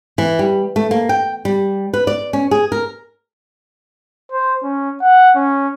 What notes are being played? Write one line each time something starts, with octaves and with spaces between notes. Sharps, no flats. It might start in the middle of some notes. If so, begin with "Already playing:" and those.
E3
G3
A3
A#3
G5
G3
B4
D5
C#4
G#4
A#4
C5
C#4
F#5
C#4